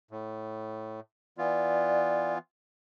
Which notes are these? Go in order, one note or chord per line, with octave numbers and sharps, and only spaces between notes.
A2
E3 B3 F4 D5